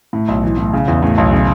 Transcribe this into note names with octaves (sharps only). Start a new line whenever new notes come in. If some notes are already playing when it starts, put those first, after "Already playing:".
A2
B1
E3
A2
C#3
E2
A2
B1
C#3